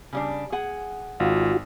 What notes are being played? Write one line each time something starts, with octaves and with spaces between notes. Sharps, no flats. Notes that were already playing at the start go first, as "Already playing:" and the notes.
C#3 G3 D4
G#4 F#5
G#1 F4 F#4